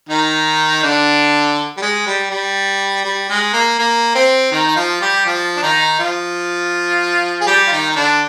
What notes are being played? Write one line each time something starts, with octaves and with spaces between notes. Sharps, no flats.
D#3 D#4
D3 D4
G3
G#3
G3
G3
G3
G#3
A#3
A#3
C4
D#3 D#4
D#4
F3 F4
G3 G4
F3 F4
D4
D#3 D#4
F3 F4
G#4
G3 G4
F4
D#3 D#4
D#4
D3 D4